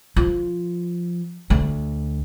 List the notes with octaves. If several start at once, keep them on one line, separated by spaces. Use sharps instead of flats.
F3
D2